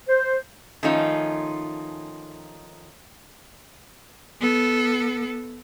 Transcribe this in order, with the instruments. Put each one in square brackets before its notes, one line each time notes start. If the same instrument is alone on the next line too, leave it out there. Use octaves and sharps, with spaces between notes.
[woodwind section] C5
[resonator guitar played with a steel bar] D#3 F3 A3 C#4 D#4 F4
[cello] B3 A4